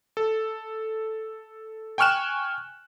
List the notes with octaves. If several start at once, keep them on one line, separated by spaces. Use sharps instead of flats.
A4
G5 G#5 C#6 F6 F#6 E7